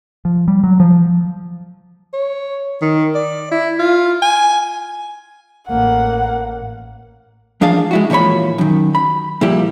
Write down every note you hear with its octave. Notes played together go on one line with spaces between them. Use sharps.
F3
G3
F#3
F3
C#5
D#3
D5
E4
F4
G#5
A1 A#3 F#5
E3 F3 D4 G#4 F5 A5
G#3 E4 F#4
A#2 E3 F3 C#5 B5
F#2 D#3
B5
A#2 F3 G3 E4 G4